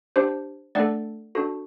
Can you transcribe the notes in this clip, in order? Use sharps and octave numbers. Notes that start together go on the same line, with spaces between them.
D4 G4 C5
A3 D4 A4 D5 F#5
D4 F#4 A4